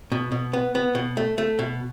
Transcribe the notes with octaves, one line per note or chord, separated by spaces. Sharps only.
B2
B2
B3
B3
B2
A3
A3
B2